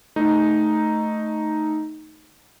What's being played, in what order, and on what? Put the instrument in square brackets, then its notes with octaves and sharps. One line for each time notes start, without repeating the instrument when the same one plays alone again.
[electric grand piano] A3 D#4